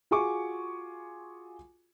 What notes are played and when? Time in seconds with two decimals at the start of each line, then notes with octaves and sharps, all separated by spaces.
0.11 F4 F#4 G#4 G#5 C#6 D6